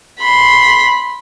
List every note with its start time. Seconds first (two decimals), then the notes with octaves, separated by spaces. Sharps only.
0.19 B5 C6